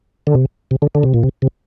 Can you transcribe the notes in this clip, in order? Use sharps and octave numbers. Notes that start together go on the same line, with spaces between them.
D3
C3
C3
D3
D3
C3
A#2
C3
C3